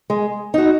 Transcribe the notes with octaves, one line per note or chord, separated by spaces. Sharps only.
G#3
D#4 F#4